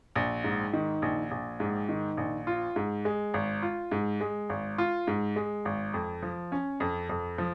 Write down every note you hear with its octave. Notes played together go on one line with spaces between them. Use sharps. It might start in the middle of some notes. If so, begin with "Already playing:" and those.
A#1
G#2
D#3
A#1
A#1
G#2
D#3
A#1
F4
G#2
G#3
G#1
F4
G#2
G#3
G#1
F4
G#2
G#3
G#1
F2
F3
C#4
F2
F2
F3